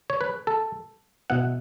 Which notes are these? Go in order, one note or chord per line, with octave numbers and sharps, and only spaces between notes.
C#5
B4
A4
B2 B3 E4 F#5